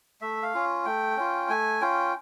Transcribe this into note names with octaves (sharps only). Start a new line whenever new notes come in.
A3 E5
F5
C#4 F4
A3 G5
C#4 F4
A3 G#5
C#4 F4 G5